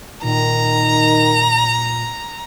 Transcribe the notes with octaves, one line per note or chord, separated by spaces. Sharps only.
A#2 D#3 A#5